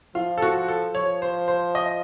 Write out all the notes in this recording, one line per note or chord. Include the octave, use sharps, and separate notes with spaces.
F3 F4
A4
F#4
A4
F3 C#5
C5
C5
D#5